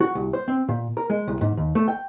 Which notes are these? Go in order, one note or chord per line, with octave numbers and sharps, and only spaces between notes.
F#4
C2
C5
C4
A#2
A#4
G#3
C2
G#2
D#2
A3
G5